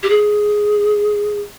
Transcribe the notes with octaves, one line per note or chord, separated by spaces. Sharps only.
G4
G#4